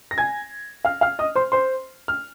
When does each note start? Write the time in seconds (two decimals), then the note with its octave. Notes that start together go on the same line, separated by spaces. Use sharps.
0.11 A#6
0.18 G#5 G#6
0.85 F5 F6
1.01 F5 F6
1.19 D#5 D#6
1.36 C5 C6
1.52 C5 C6
2.08 F6